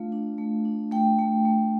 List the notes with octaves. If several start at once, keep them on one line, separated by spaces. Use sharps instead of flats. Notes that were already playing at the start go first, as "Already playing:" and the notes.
Already playing: A3 D4 F4 F5
D4
A3
D4
A3 G5
A3
A3